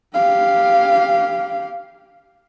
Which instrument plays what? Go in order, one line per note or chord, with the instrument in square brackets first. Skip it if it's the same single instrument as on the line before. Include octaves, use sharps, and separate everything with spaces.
[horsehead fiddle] G4 F5